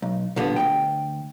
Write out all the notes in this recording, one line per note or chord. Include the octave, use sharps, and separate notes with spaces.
B1
A#2 D3 G3 B3
D2 A#2 G5